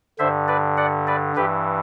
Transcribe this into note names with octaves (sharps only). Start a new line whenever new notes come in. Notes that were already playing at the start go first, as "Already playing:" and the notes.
G2 D3 C5 E5
B4 D5
D5 F#5
B4 D5
G2 E3 G4 B4